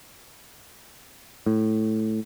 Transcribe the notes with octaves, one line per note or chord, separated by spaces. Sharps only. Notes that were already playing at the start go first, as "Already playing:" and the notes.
A2